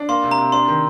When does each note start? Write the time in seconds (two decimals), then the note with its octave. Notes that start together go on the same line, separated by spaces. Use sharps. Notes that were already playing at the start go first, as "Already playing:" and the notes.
Already playing: D4
0.09 A#3 C6
0.24 C3
0.31 A#5
0.38 C3
0.52 D4 C6
0.68 D#3